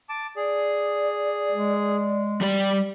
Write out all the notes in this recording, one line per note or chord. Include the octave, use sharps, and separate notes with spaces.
A5 D6
G#4 D5
G#3
G3 G4 D5